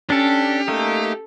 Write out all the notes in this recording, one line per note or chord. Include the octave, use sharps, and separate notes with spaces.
C#4 D4 G4 A4
A3 A#3 D#4 A4